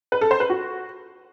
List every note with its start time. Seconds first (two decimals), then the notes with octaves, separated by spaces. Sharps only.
0.12 B4
0.21 A4
0.31 C5
0.40 B4
0.50 F#4